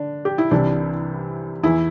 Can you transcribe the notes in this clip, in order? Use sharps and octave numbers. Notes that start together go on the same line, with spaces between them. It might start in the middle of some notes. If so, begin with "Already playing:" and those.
Already playing: D3 D4
G4
E4
C2 C3 E3 D4
E2 E3 E4